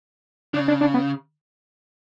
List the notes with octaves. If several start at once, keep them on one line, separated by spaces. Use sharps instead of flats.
C#3 D4
D4
D4
B3